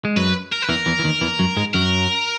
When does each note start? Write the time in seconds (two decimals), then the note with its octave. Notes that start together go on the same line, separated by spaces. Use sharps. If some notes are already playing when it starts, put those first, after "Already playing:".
0.05 G#3
0.16 F#2 F#3 B4
0.52 A#4
0.62 B4
0.69 E2 E3 A#4
0.86 E2 E3
0.99 E3
1.04 D#2 D#3
1.21 E2 E3
1.39 F#2 F#3
1.57 G#2 G#3
1.74 F#2 F#3 A#4